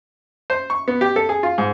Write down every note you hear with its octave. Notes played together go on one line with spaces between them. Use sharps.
C5
C#6
B3
G4
A4
G#4
F4
G#2